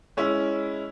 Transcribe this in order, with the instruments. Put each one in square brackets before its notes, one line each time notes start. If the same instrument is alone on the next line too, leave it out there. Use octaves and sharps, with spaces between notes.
[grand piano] G#3 C#4 E4